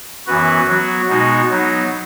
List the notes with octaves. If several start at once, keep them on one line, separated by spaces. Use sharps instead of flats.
F#2 E3 B3 F#4 B4
F#3 B3 F#4
B2 G#3 B3 D#4 F#4
F#3 B3 D#4